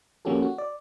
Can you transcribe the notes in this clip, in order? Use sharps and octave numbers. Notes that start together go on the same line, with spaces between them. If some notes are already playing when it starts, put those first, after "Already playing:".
F3 A#3 C#4 F#4 G4 A4
F#4
D5